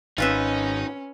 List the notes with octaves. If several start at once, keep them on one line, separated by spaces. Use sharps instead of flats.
G#1 C#4 D#4 F4 B4 E5